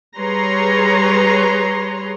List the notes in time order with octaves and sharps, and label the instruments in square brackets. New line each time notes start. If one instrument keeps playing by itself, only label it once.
[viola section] G3 G#4 B4 C#5 A#5 C6